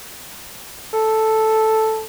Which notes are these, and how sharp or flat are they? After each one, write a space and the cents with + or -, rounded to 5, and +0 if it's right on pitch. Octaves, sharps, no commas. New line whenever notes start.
A4 +0